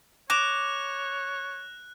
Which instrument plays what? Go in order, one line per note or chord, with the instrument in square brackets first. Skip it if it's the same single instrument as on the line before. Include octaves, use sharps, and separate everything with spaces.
[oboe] C#5 [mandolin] D6 [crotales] F#6 [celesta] A#6 E7 F7